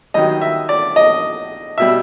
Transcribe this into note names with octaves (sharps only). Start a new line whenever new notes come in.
G2 D#3 F#3 D#5
E5
D5
D#5
B2 G3 E5